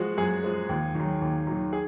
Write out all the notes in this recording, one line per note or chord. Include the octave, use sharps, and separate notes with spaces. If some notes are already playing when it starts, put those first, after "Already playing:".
Already playing: F3 G#3 F#4
F#2 G#4
F3 G#3
D#2
D#3 F#3
D#2
D#3 F#3
G#4